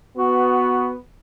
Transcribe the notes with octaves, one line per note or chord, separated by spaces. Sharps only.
B3 F#4